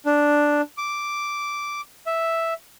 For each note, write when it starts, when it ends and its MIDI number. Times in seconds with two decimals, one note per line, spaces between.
0.06 0.61 62
0.77 1.81 86
2.06 2.54 76